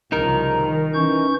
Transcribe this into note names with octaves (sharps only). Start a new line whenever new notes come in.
C2 C#3 F3 D#4 A#4 A#5
D#3
E3 C#4 C#6 G6